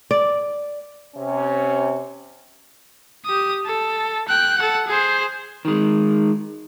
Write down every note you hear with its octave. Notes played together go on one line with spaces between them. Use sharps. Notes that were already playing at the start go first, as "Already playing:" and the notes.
D5
C3 C#4
G4 D#6
A4
G5 F#6
A4 F#5
G#4 C5
D#3 G#3